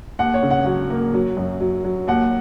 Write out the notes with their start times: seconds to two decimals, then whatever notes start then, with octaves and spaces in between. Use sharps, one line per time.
0.19 D#2 F#5
0.34 C#5
0.43 C#3
0.51 F#5
0.65 F#3 F#5
0.90 A#3
1.14 F#3
1.37 F#2
1.60 F#3
1.84 F#3
2.08 D#2 F#5